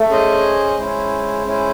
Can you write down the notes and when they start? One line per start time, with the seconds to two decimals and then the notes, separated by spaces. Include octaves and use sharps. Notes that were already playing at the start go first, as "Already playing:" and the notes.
Already playing: A3
0.10 C#4 G#4 C5 D#5
0.78 G#3 C#4 E4 C5
1.46 C#4 E4 C5